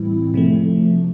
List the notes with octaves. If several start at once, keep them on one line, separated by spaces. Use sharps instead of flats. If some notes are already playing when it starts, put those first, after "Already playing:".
Already playing: A2 E3 G3 C4 E4
C3 F3 A3